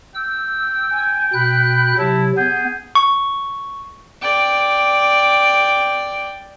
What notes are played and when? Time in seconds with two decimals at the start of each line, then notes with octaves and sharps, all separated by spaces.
0.15 G5 E6
0.91 G#5
1.34 B2 B5 F#6
1.98 C3 F#3 E4 A5
2.37 B3 G#4 G6
2.95 C#6
4.22 D5 G5